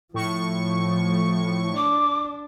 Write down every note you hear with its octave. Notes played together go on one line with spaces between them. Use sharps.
A2 F3 C#6
D4 D6